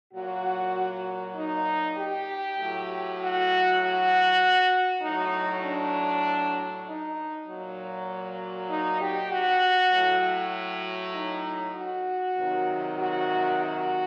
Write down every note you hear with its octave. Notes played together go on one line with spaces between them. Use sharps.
A#2 F#3 F#4
D#4
G4
A2 F#3
F#4
F#4
A2 F#3 D#4
D4
D#4
A#2 F#3
D#4
G4
F#4
A2 F#3
D#4
F#4
C3 D#3 F#3
F#4
F#4